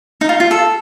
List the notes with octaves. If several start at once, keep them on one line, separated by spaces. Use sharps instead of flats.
D#4
F4
F4
A4